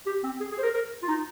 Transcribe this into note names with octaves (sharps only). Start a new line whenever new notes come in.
G4
C4
G#4
G#4
C5
A#4
A#4
F4
D#4